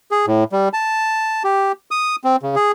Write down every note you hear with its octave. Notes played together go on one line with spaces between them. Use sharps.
G#4
A2
G3
A5
G4
D#6
C4
C#3
G#4